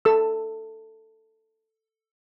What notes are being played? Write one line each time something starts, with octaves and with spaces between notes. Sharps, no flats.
A4 E6